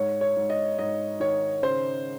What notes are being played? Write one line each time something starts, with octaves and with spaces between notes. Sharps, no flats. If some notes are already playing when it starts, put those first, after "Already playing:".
Already playing: G#2 C#5
C#5
G#2
D#5
G#2 D#5
D#3 C#5
C#3 C5